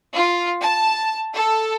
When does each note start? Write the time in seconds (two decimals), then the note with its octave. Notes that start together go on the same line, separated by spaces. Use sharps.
0.15 F4
0.61 A5
1.33 A4